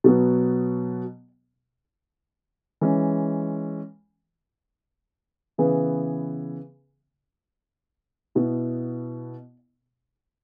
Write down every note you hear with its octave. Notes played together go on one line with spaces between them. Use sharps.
B2 F#3 B3
E3 G#3 C#4
C#3 E3 B3 G#4 B4
B2 B3 E4